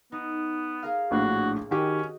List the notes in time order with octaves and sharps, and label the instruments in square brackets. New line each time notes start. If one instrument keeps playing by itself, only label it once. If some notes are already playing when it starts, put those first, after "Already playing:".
[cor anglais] B3 [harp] D#4
[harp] G#4 A#4 F5
[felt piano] A#1 A2 D4 [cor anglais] F#4
[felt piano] D#3 G4 [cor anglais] C#4 [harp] F#4 D#5